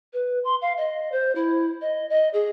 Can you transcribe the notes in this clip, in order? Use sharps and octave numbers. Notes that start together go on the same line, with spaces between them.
B4
C6
F5
D#5
C5
E4
D#5
D#5
G#4